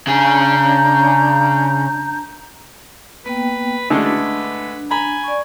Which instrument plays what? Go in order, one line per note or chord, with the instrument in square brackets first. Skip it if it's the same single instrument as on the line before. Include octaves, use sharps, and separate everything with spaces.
[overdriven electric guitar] C#3 G#4 [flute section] D4 A#5 G6
[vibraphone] A#3 B3 G5 [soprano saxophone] B4
[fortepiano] D3 G#3 A3 [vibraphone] C#4 E4 F#4 [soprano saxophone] D4
[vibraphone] D4 [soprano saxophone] B4
[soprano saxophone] G#5 [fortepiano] A#5 B5
[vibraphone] D5 C#6